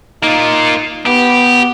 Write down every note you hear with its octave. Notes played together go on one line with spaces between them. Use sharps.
A#3 D#4 F4
B3 G4